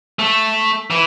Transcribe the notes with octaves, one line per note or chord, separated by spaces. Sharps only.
A3
E3